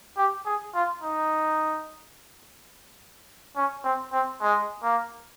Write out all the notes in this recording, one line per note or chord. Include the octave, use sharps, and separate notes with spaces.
G4
G#4
F4
D#4
C#4
C4
C4
G#3
A#3